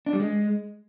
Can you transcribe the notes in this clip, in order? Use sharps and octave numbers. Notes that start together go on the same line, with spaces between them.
D4
G3
G#3